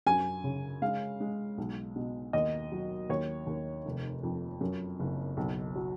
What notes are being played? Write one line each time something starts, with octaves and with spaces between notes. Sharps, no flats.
F#2 G#5
C#3
G#3 F5
G#3
B1
B2
D#2 D#5
F#3
D#2 C#5
D#2
F1
F2
F#2
F#1
B1
F#3